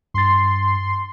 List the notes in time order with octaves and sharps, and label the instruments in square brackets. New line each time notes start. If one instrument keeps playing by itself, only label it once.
[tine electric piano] G2 A6 [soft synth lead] C6